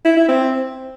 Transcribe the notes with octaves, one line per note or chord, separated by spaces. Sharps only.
E4
E4
C4